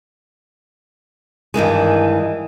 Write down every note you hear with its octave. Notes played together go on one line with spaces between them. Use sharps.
G2 D#3 E3 G#3